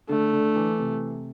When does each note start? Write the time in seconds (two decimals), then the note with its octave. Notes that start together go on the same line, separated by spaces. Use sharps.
0.09 D3 A3
0.33 D3
0.56 E3
0.79 C3